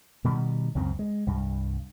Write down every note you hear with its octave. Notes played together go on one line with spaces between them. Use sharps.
B2 D#3 G3
C#2 F#2 C#3 C4
G#3
C2 G2